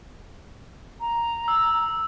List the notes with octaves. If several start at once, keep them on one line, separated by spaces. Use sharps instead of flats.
A#5
E6